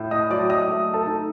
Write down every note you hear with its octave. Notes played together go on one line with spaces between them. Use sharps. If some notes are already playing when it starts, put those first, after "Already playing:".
Already playing: A2
D#5 D#6
F#3 D5 D6
D#5 D#6
A3
A4 A5
D#4